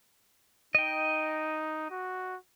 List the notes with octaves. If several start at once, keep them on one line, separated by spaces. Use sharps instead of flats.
D#4 D#5 G5
F#4